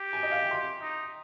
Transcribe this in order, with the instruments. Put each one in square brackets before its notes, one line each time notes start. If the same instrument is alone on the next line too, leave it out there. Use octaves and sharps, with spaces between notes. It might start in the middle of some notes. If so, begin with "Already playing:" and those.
Already playing: [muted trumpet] G4
[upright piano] G#5
D#5
F5
G5
C6
[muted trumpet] D#4